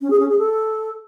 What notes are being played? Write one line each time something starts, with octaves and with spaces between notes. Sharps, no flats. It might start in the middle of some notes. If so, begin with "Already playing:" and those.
C#4
G#4
C#4
G#4
A4